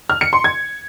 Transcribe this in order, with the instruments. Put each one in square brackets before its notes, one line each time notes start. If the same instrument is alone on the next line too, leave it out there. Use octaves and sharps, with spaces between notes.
[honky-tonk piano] F6
C#7
C6
G#6